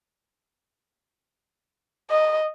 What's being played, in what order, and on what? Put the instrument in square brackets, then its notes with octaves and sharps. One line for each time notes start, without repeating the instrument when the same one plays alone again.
[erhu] D#5